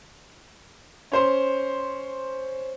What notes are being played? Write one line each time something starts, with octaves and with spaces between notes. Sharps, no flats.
C#4 C5 C6